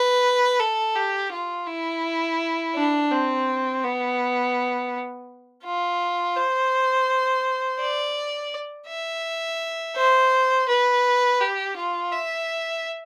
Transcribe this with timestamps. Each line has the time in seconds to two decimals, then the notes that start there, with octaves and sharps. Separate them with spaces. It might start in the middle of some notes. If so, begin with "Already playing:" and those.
Already playing: B4
0.60 A4
0.96 G4
1.32 F4
1.67 E4
2.76 D4
3.12 C4
3.85 B3
5.65 F4
6.36 C5
7.80 D5
8.89 E5
9.97 C5
10.69 B4
11.41 G4
11.77 F4
12.13 E5